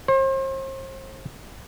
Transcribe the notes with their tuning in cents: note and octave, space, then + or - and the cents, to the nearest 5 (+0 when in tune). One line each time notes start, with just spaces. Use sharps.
C5 +40